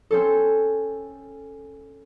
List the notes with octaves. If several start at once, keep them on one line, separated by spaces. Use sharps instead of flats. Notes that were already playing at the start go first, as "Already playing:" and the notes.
C4 C#4 A4